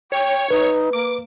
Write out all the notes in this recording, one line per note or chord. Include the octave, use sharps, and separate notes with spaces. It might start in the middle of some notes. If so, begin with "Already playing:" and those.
C#5 G5
D#4 B4
A#3 D6